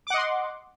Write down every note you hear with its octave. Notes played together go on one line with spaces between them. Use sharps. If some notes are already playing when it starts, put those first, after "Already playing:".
D#5 F#5 C6 D6